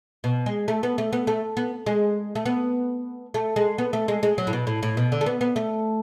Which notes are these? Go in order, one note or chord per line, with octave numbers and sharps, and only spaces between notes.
B2
G#3
A3
B3
A3
B3
A3
B3
G#3
A3
B3
A3
G#3
B3
A3
G#3
G#3
F#3
A2
B2
A2
A2
B2
D3
A3
B3
B3
A3